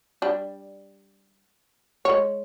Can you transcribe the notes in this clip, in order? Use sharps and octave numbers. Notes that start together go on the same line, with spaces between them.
G3 D4
G#3 C#5